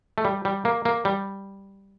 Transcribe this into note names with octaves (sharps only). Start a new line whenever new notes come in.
A3
G3
G3
A#3
A#3
G3